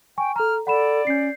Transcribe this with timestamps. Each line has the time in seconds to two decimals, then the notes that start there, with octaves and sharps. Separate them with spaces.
0.18 G5 G#5 C#6
0.36 A4 A#5 F6
0.67 A4 D5 F#5 B5 E7
1.07 C#4 G6 C7